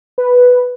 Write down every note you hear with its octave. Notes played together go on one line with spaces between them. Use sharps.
B4